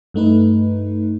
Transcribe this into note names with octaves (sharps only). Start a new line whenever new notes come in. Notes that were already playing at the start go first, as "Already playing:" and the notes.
G2 A3 D#4 B4